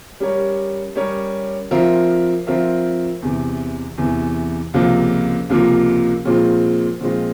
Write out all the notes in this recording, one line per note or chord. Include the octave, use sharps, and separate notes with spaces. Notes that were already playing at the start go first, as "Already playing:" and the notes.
G3 C#4 G4 A#4 C#5
G3 C#4 G4 A#4 C#5
F3 C4 F4 A#4 E5
F3 C4 F4 A#4 E5
E2 C3 E3
E2 C3 E3
C#2 C3 F3 A#3 F4
C#2 C3 F3 A#3 F4
A#2 F3 G#3 C4 F4
A#2 F3 G#3 C4 F4